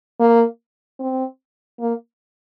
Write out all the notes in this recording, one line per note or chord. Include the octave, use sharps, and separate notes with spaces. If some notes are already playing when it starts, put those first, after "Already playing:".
A#3
C4
A#3